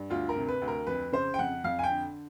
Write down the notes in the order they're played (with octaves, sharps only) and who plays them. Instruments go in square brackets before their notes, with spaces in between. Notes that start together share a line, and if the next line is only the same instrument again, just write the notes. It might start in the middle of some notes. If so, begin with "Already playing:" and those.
Already playing: [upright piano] G2
D2 F4
A#4
C3
B4
D2
A#4
F2 B4
C#3 C5
G5
F2 F#5
F2 F5
G#5
G5
D3